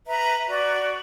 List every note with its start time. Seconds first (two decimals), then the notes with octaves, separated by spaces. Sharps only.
0.06 B4 E5 A#5
0.48 F#4 D5